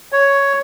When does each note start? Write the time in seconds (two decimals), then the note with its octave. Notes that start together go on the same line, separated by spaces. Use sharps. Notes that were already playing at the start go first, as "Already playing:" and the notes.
0.12 C#5